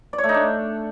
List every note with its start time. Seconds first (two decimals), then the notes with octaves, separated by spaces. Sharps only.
0.13 D5
0.18 C#5
0.24 A3
0.29 D#4
0.34 D4